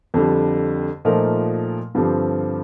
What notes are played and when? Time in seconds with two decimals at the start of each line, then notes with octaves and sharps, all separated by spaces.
0.14 F2 D3 G3
1.05 A#2 F3 A3 D#4 A#4
1.95 G2 D3 F3 C4 G4